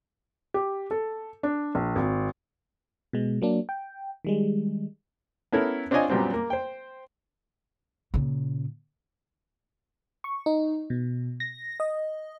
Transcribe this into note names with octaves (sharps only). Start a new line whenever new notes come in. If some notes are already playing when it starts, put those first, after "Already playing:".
G4
A4
D4
A#1
G#1
B2 G#3
F#3 A#3 D4
G5
D#3 G3 G#3
B3 C#4 E4 A4 A#4
C4 D4 F4 C#5 D#5 G#5
F#2 A#2 F#3 G3 B3 C4
A#3
C5 G5
A#2 C#3
C#6
D#4
B2
A#6
D#5